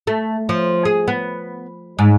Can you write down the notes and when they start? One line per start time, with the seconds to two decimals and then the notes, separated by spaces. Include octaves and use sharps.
0.07 A3
0.49 F3
0.85 G#4
1.08 B3
1.99 G#2